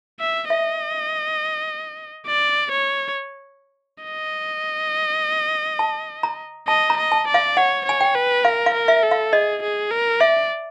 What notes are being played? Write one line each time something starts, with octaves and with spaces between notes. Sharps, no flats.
E5
D#5 E5
D5
C#5
D#5
A5
A#5
D#5 A5
A#5
D#5
A5
D5
F5
C#5 F#5
C#5 G#5
G5
B4
A#4 F5
F5
A#4
E5
A4
F5
G#4 D#5
G#4
A#4
D5 E5